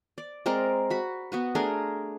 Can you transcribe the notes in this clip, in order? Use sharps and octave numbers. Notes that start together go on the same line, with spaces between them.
D5
G#3 C4 A#4 D5
F#4 B5
B3 F#4 B4
A3 D4 G#4 A#4